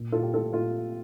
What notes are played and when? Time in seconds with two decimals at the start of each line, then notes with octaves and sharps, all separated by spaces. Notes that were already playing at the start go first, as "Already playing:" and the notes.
Already playing: A#2
0.12 A#2 F4 A4
0.23 G4
0.33 A3 F4 A4
0.53 A#2 F4 A4